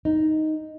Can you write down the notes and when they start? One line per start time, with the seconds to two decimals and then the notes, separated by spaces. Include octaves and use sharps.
0.05 D#4